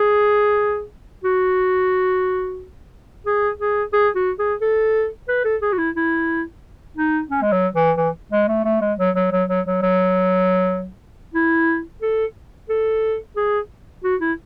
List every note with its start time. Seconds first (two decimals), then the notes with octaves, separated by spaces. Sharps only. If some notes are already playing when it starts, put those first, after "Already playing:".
Already playing: G#4
1.24 F#4
3.26 G#4
3.60 G#4
3.93 G#4
4.16 F#4
4.39 G#4
4.61 A4
5.28 B4
5.44 A4
5.62 G#4
5.72 F#4
5.78 E4
5.95 E4
6.97 D#4
7.30 C#4
7.42 G#3
7.52 F#3
7.76 E3
7.97 E3
8.32 G#3
8.48 A3
8.65 A3
8.81 G#3
8.99 F#3
9.16 F#3
9.32 F#3
9.49 F#3
9.66 F#3
9.82 F#3
11.34 E4
12.02 A4
12.69 A4
13.36 G#4
14.04 F#4
14.21 E4